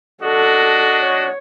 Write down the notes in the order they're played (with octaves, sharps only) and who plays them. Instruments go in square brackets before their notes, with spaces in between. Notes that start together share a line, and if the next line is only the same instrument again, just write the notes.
[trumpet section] D4 F#4 D#5 [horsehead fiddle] A4
[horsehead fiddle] C#5